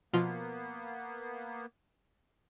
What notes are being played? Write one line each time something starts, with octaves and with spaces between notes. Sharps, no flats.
B2 F3 A#3 B3 F4